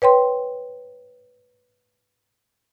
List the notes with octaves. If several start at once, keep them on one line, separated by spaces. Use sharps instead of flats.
B4 C#5 G5 C6